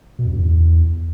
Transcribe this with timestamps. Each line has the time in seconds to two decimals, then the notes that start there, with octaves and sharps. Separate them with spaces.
0.19 B2
0.25 F2
0.32 G2
0.38 E2